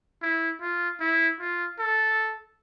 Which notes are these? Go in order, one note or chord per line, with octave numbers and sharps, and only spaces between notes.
E4
F4
E4
F4
A4